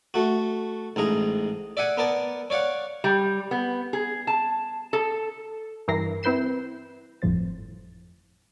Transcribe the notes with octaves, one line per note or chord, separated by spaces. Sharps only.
A3 F#4
A1 G#2 G#4 A#5
D5 E5 F#5 G#5
B3 A#4 D5 A5
C#5 D5 F5 F#5
G3
B3
G#4
A5
A4
G2 E3 E4 A#4 A#6 C7
C4 E4 B4 G6 C7 E7
G1 F2 A2 F3 C5 A6